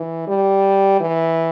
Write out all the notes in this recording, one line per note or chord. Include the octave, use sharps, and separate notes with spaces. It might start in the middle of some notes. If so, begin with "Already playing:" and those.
Already playing: E3
G3
E3